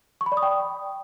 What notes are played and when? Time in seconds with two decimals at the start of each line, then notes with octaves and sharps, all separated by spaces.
0.21 C#6
0.26 B5
0.32 D5
0.37 D#6
0.43 G5